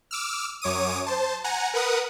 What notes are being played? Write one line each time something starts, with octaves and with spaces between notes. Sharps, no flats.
D6 E6 F6
F#2 C#5 D6 D#6 D#7
C5 A5
F#5 G#5 A#5
A#4 B4 F#5 D#6